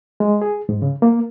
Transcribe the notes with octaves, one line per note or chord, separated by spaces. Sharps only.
G#3
G#4
G#2
C#3
A#3